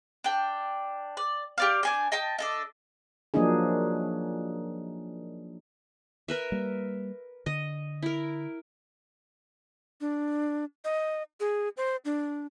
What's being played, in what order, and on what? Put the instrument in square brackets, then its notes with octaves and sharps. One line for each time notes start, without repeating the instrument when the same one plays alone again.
[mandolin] D4 G5
D5
G4 D5 F5
D4 G#5 G6
D#5 G5 A5
D4 A4 D#5
[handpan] F3 F#3 A#3 D4 D#4 G#4
[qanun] A#4 B4 E5
[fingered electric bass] G3 A#3
[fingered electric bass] D3 [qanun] D#5
[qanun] E4 A#4
[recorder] D4
D#5
G#4
C5
D4